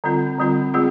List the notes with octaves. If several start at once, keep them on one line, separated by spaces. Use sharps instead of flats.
D3 G3 C4 F4
D3 G3 C4 F4
G#3 C4 F4 G#4